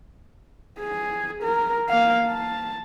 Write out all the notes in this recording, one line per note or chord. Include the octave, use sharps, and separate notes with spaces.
G#4
A#4
A#3 F5
A5